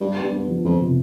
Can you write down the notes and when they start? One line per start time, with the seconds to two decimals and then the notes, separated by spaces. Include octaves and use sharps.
0.01 G2 D4
0.16 B3
0.22 G2
0.33 B3
0.48 F3
0.65 F2 F3
0.81 C3